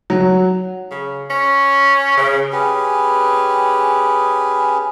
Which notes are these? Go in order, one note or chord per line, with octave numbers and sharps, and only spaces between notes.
F#3
C#3
C#4
C#3
C#4 G4 G#4 B4